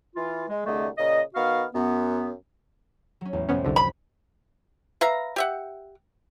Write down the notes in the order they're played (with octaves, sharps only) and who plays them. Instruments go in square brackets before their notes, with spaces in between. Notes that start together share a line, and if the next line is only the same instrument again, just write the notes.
[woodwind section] E3 F4
G#3
C2 D3 A3 G#4 D#5
A#2 C#3 D#5
D#3 B3 F#4 F5
F#2 B3
[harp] F#3 C#4
[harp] A1 [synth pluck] E2
[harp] F2 C3 [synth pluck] B3 C#4
[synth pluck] C2 D3
[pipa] B5
B4 E5 F5 A#5
G4 E5 F#5